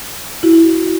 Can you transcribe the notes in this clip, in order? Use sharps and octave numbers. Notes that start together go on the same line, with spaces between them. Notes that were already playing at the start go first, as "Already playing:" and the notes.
E4 F#4